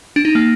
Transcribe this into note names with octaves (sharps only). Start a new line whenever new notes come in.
D4
D#4
A#3